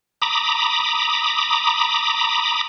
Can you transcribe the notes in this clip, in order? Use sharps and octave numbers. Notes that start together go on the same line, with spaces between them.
A#5 B5 D6 D#6